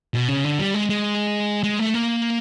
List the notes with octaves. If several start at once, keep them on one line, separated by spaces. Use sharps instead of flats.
B2
C#3
D3
G3
G#3
G#3
G#3
A3
A#3